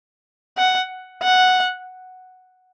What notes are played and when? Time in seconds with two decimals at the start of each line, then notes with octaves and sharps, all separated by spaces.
0.57 F#5
1.23 F#5